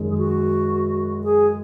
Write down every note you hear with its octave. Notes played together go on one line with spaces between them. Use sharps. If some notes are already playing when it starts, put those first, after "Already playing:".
Already playing: F#2 D#3 G#3
G#4
F#4
G#4